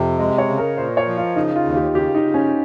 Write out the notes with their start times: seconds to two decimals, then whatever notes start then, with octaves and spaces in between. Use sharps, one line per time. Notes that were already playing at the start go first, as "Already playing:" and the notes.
Already playing: F2 C3
0.19 G#3 D#5
0.38 C#5
0.48 C#3
0.58 A#4
0.77 A#2 C5
0.97 C#5
1.07 F3
1.17 F4
1.36 C#3 D#4
1.56 F4
1.65 D#2
1.76 G4
1.95 C#3 G4
2.15 D#4
2.25 C#3
2.34 C#4